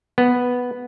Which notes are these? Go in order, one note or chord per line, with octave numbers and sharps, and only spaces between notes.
B3